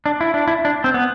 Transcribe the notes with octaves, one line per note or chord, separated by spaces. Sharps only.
D4
E4
D4
E4
D4
C4
B3